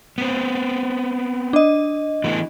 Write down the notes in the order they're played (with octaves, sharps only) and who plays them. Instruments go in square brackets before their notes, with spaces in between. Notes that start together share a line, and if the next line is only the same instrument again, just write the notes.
[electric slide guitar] B3 C4
[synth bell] D4 D#5
[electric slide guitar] E3 A3 B3